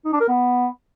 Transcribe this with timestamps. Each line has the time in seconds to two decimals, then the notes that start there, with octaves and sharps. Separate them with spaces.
0.05 D#4
0.13 D4
0.21 A#4
0.28 B3